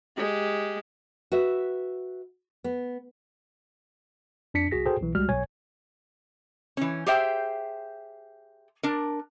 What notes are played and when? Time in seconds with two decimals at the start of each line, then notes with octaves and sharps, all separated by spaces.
0.17 G#3 G4
1.32 F#4 B4 E5
2.64 B3
4.54 F2 D4 B6 C#7
4.71 C2 F#4 G#4 A#6 B6
4.85 F#4 G#4 A4 C5 G5
5.01 B1 E3
5.15 C#2 G3 G#3 F#4 F6
5.29 B1 C#5 G#5 G#6
6.77 E3 C#4
7.06 G4 G#4 C5 E5 G5
8.83 D4 A#4